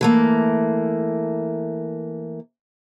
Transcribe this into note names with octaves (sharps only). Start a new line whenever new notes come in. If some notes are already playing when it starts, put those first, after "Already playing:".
E3 A3 A#3